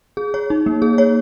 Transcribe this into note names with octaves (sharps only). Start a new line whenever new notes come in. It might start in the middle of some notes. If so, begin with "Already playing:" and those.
G#4
C#5
D#4
A#3
G#4
C#5